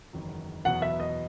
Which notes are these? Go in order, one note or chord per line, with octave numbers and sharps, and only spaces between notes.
F#1 E2 D#3 F#3
E2 B2 F#3 B3 F#5
E5
D#5